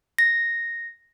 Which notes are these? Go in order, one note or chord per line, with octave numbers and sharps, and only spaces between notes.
A#6